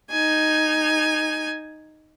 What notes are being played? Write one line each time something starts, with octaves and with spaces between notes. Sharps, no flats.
D#4 G#5